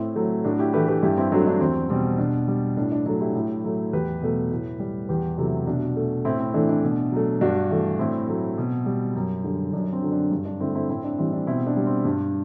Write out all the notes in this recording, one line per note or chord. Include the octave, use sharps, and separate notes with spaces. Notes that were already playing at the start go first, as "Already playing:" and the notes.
Already playing: A2 C4 E4
F#3 A3
A2 D4 F#4
E4 G4
E3 A3 G4 B4
G4 B4
G2 E4 G4
C4 E4
F#3 A3 D4 F#4
D4
E2 C4
B2 G3 C4
B2 D4
G3
A2 D4
D4
F#3 A3 D4
E4 G4
A2
F#3 A3
E2 G4 B4
B2 F#3 A3
A2
G3
E2 G4 B4
C3 F#3 A3 E4 G4
B2 D4 F#4
A3
A2 C4 E4
C4
E3 A3 D4
D4
B2
F#3 A3
G2 D4 F#4
E3 A3
A2 C4 E4
F#3 A3
B2
G3
F#2
D3 G3
F#2 D4
D4
C4
D3 F#3
D4
G2
D4
D3 A3 C4 E4
C4 E4
A2 C4 E4
D4
E3 G3 C4
D4
B2 C4 E4
D4
G3
C4
G2 D4